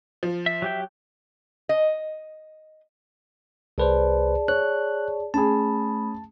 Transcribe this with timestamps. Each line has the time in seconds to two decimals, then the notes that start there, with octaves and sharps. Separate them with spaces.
0.23 F3
0.46 E5
0.62 F#3 G4 G5
1.69 D#5
3.78 C2 G#4 B4 C5 D5 A5
4.48 C#5 F#6
5.34 A3 C#4 G#4 A5 B5